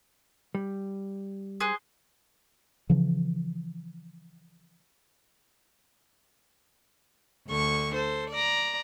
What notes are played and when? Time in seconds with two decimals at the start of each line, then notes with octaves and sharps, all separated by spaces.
0.55 G3
1.60 G#4 C5 F#6
2.90 C#3 E3 F3
7.47 D2 D3 C#6
7.93 A4 C5
8.30 D5 A#5